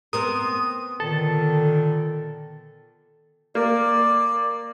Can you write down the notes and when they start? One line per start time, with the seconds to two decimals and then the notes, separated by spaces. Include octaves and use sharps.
0.13 B3 C4 A#4 D#6
1.00 A#2 D3 D#3 A4
3.55 A#3 D5